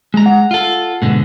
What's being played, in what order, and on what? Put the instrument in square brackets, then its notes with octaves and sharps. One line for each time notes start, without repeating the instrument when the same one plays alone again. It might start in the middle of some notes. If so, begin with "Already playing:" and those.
[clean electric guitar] G#3 A#5
[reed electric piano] F#5
[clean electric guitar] F4 A4
G#2 B2 D3